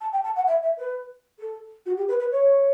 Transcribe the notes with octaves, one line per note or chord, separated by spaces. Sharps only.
A5
G5
A5
F#5
E5
E5
B4
A4
F#4
G4
B4
B4
C#5